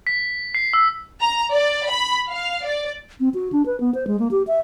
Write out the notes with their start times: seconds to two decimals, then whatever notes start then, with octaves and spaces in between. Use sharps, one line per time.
0.07 B6
0.55 C7
0.73 E6
1.21 A#5
1.55 D5
1.89 B5
2.30 F5
2.65 D5
3.20 C4
3.34 F#4
3.52 D4
3.66 B4
3.80 B3
3.95 C5
4.07 G#3
4.19 A#3
4.31 G4
4.47 E5